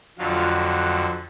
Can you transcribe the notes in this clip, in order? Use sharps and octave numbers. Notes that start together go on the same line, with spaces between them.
F2 D3 F#3 F4